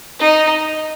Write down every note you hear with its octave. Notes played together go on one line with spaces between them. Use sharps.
D#4